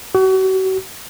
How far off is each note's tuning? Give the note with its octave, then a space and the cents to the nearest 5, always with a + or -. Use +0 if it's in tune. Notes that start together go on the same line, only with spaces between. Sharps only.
F#4 +35